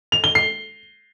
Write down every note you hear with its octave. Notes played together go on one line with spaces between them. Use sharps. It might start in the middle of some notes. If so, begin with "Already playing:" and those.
F7
G7
C7